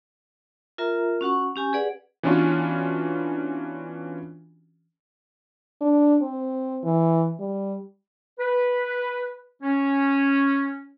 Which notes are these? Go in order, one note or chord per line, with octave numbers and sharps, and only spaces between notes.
F4 A#4 E5 A#5
C#4 F#4 F#5 C#6
C#4 G4 G#5
G#4 B4 D5 F#5
E3 B3 C#4 D4 F4 F#4
D4
C4
E3
G3
B4
C#4